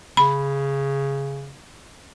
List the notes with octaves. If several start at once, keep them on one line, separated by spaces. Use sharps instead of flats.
C#3 B5